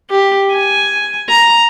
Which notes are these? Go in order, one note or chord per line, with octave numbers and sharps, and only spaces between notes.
G4
G#5
A#5